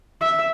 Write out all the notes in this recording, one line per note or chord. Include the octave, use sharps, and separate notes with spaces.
E5